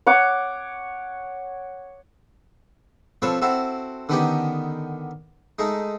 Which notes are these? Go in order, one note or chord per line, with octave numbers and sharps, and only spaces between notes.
C#5 F#5 D6
F3 C4 A4 B4 C#5
C4 E4 F#4 A4
D3 D#3 B3 C#4 D#4 G4
G#3 A3 D#4